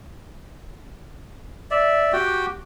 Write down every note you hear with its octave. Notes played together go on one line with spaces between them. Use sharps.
D5 E5
F#4 G4 G5